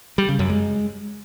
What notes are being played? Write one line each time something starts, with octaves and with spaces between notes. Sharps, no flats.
G3
C#3
F#2
G#3